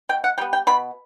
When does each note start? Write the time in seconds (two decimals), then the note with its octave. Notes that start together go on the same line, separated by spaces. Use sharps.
0.09 B2 G5
0.24 F#5
0.38 G3 B3 G5
0.53 G5
0.67 B2 B5